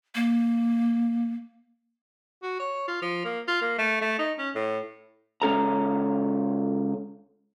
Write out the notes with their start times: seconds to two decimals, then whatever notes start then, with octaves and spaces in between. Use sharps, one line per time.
0.15 A#3
2.43 F#4
2.59 C#5
2.88 F4
3.02 F3
3.24 A#3
3.48 F4
3.61 A#3
3.78 A3
4.01 A3
4.19 D#4
4.38 C#4
4.55 A2
5.42 C#2 C#4 A4 A#5